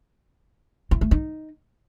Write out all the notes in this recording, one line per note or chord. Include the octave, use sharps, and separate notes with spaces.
E4
A3
D#4